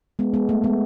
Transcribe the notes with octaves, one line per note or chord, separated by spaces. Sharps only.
G#3 B3
G#3 B3
A3
G#3 B3